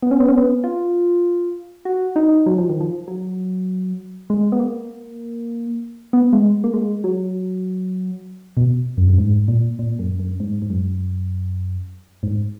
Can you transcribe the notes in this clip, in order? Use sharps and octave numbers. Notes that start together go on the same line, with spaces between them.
B3
C#4
B3
C#4
B3
F4
F#4
D#4
F#3
F3
D#3
F3
F#3
G#3
B3
A#3
B3
G#3
A#3
G#3
F#3
B2
F#2
F#2
G#2
A#2
A#2
F#2
F#2
G#2
G#2
F#2
G#2